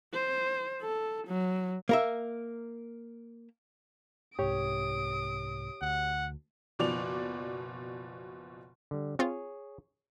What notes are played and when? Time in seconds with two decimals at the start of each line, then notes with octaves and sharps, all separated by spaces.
0.12 C5
0.82 A4
1.28 F#3
1.89 A#3 A#4 E5
4.39 C2 G#2 G4 C#5 D#6 D7
5.82 D2 F#5
6.79 F#1 B2 F3 D5 F7
8.91 D3 G3
9.19 C4 F4 G#4 C#5